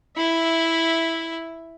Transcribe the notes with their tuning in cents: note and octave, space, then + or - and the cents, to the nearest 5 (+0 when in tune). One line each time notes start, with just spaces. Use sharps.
E4 -5 E5 +0